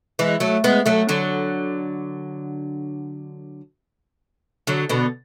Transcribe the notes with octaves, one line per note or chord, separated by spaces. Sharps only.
E3 G#3
F#3 A3
G#3 B3
F#3 A3
D3 F#3
D3 F#3
B2 D3